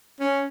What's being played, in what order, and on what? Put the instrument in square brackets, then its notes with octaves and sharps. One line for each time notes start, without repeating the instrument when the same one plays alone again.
[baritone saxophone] C#4